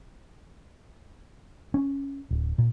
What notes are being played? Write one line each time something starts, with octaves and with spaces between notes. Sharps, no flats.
C#4
D1
A#2